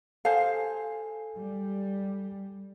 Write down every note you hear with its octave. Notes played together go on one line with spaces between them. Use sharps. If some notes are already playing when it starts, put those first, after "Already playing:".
A4 C5 F5 G#5
G3